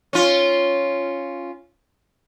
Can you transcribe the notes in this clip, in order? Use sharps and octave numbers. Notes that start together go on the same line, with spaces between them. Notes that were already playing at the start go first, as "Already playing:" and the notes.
C#4 F4